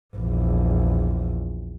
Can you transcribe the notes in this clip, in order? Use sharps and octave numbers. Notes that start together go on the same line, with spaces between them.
A#1 E2